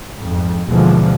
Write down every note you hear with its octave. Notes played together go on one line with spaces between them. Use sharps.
F2 G#2
D#2 B2 D3 E3 F3 G#3